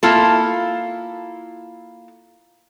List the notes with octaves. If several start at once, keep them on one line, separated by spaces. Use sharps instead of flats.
A#3 E4 F4 A4